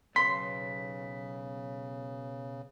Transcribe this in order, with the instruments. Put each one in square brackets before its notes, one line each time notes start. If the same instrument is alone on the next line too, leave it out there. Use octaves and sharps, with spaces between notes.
[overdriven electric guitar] B1 G#2 [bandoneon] C#3 [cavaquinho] C6 [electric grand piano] B6